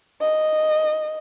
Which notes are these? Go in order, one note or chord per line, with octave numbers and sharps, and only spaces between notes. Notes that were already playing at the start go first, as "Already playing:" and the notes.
D#5